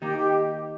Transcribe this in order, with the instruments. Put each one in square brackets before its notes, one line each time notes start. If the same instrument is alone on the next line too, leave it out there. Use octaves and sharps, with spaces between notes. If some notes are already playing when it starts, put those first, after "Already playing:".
[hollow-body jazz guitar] D#3 A#3 D#4 [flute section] G4
[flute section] G4